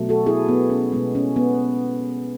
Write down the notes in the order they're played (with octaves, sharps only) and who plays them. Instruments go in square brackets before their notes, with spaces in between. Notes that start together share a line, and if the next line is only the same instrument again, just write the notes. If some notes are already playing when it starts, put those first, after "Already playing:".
Already playing: [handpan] B2 F#3 A3
F#4 A4
E4 G#4
B3
C#4
B2 G#3 B3
C#4
B3